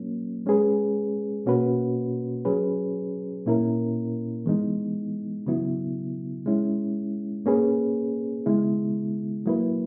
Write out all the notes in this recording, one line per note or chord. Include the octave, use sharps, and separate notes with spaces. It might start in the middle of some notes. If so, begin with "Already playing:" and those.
Already playing: F#3 A#3 C#4
G#3 C#4 G#4 B4
B2 A#3 C#4 F#4 B4
F#3 C#4 G#4 B4
A#2 A#3 C#4 E4 A#4
E3 G#3 B3 D#4
C#3 F#3 B3 E4
G#3 C#4 E4
A#3 C#4 G#4 B4
C#3 G#3 B3 E4
F#3 A#3 E4 B4